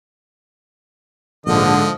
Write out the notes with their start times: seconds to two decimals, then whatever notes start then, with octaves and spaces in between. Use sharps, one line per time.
1.46 A#1 G#2 D3 F3 D#5